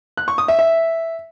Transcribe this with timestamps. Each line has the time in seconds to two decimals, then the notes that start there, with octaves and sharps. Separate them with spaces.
0.17 F#6
0.28 C#6
0.38 D#6
0.48 E5
0.59 E5